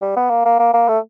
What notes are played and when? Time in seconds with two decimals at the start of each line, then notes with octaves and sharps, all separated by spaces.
0.02 G3
0.16 B3
0.30 A#3
0.45 A#3
0.59 A#3
0.74 A#3
0.88 A3